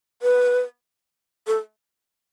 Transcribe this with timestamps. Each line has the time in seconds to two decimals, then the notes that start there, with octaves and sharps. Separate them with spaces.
0.22 B4
1.47 A4